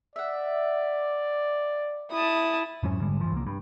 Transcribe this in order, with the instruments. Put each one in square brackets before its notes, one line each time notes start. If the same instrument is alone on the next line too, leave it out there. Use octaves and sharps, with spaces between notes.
[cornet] D5 [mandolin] E5 F#5
[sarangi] E4 [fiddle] A5 D#6
[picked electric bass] F2 G#2 F#3 C#4
G#2 D3 G3 G#3
G2 E3 F3
C2 A#3
G2